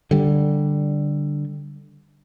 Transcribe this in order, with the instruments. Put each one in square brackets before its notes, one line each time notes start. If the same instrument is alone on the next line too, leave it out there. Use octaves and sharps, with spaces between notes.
[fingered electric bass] D3 G3